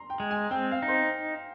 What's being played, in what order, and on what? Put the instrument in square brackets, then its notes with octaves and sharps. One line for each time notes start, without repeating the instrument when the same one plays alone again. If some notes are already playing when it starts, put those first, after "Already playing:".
Already playing: [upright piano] A#5 C6
G5
[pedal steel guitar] G#3
[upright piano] G#5
[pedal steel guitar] C4 [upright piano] G5
[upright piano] F5
[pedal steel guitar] D#4
[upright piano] C5